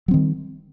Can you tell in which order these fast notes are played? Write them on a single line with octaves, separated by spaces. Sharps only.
F#3 C4 D#3 G3